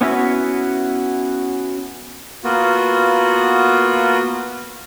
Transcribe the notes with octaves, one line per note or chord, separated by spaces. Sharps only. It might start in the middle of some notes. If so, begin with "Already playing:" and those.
B3 C#4 E4 F#4 E5
A#3 B3 F4 F#4